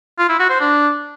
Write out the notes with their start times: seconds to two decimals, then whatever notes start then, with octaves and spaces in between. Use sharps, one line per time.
0.18 F4
0.29 E4
0.39 F#4
0.50 C5
0.60 D4